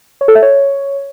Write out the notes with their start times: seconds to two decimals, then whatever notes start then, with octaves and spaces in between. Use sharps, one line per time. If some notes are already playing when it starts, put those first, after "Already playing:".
0.21 C#5
0.28 A4
0.35 E5
0.42 C#5